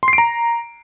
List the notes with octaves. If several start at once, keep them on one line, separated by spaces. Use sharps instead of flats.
C6
C7
D7
A#5